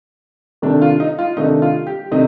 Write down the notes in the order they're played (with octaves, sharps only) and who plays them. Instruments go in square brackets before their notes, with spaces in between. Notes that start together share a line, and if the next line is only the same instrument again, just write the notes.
[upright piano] C3 D#3 A3 D4
F4
D#4
F4
C3 D#3 A3 D4 D#4
F4
G4
C3 D#3 A3 D4 D#4